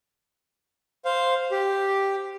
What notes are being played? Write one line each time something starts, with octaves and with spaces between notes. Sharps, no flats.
C5 F5
G4